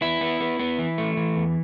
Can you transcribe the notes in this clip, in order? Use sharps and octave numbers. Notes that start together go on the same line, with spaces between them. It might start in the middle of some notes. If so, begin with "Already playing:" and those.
B3 E4
B3
B3
B3
E3
A3
E3
E2